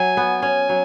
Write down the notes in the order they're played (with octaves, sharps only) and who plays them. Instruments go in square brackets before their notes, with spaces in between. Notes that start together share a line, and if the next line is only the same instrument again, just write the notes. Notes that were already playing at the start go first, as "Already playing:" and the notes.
Already playing: [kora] F#3 [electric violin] G#5
[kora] B3
[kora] C#4 [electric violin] G#5
[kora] F#3